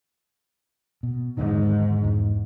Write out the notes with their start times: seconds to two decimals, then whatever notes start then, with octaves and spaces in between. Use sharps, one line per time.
1.03 B2
1.37 E2 G#2 D3 D#3
2.04 E2 G#2